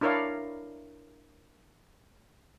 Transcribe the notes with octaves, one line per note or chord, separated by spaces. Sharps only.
D4 E4 A#4 C#5 D5 F5